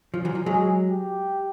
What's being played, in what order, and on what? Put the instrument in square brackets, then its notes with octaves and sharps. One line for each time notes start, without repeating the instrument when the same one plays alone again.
[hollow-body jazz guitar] F3
E3 F#3
F3
[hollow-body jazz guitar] F#3 G#3 [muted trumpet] G#4
[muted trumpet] G4